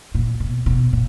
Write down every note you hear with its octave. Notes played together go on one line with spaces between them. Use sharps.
A#2
B2
B2
A#2